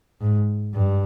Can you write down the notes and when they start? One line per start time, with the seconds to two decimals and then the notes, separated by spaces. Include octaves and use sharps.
0.21 G#2
0.74 G2